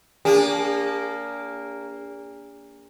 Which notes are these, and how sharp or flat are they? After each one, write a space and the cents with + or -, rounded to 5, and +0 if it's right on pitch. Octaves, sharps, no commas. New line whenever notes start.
A#3 +0 D4 -35 G#4 -45